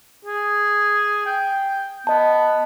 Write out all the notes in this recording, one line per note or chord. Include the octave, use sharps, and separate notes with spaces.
G#4
G5
B3 D#5 A5